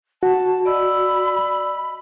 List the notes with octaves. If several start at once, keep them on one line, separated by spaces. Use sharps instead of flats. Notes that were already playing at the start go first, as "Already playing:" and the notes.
F#4 A5
D5 D#5 B5 E6